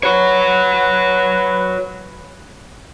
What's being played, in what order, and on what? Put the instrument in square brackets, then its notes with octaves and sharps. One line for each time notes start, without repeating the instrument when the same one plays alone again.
[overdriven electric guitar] F#4 C#5 [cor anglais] B4